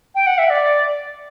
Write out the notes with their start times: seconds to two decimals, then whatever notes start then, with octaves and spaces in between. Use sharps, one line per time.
0.15 G5
0.27 F#5
0.38 E5
0.50 D5